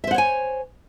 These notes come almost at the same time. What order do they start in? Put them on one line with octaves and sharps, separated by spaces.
E5 C5 F#5 C#5 G#5